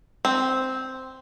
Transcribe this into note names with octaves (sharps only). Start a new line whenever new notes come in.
C4